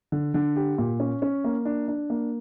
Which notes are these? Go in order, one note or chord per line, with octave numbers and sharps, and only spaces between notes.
D3
D3
G4
A#2
C#4
C#4
A#3
D4
D4
A#3